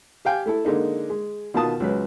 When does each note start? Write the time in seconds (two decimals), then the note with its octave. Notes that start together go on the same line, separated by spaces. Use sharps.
0.25 G4 F5 G5 G#5
0.46 A3 E4 A4
0.65 D3 G#3 A#3 D#4
1.10 G#3
1.54 B2 D#3 B3 F4 A5 D#6
1.80 C#2 F#3 B4